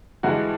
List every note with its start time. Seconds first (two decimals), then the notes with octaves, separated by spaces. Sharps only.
0.23 G2 E3 G#3 F#4